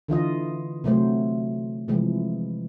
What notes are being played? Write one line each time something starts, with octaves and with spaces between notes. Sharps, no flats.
D3 E3 F4 D#5
C3 F#3 A3 C5
C3 E3 F3 G#3